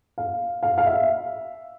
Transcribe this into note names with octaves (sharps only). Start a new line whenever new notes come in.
F5
F5
F5
E5